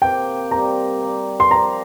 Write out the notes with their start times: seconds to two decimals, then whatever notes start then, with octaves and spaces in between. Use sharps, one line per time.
0.02 C3 A#3 G4 G5
0.51 G3 C4 G4 D5 A#5
1.01 A#3 G4 D5
1.40 C6
1.51 F3 D4 G4 A#5